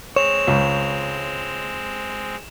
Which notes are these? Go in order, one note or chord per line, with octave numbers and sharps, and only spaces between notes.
G#3 C4 C#5 E7 F7
C#2